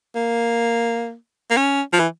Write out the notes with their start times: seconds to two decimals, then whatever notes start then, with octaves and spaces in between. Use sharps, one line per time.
0.15 A#3
1.50 A#3
1.57 C#4
1.93 F3
2.00 E3